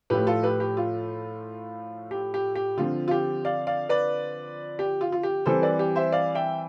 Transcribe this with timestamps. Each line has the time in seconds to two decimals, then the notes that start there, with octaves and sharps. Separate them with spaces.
0.10 A2 F3 A3 G4 B4
0.27 F4 A4
0.43 G4 B4
0.60 G4
0.77 F4
2.11 G4
2.34 G4
2.55 G4
2.77 D3 F3 C4 F4
3.08 F4
3.11 G4
3.45 D5 F5
3.67 D5 F5
3.89 B4 D5
4.79 G4
5.01 F4
5.12 F4
5.23 G4
5.46 E3 G3 C4 A4 C5
5.62 B4 D5
5.79 G4
5.96 C5 E5
6.12 D5 F5
6.35 E5 G5